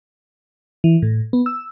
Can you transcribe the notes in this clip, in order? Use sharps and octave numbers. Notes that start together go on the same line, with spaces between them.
E3
A2
B3
E6